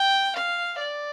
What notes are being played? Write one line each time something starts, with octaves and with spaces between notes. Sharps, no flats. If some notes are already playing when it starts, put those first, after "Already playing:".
Already playing: G5
F5
D5